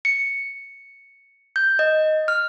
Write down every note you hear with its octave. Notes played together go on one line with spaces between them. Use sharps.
C#7
G6
D#5
F6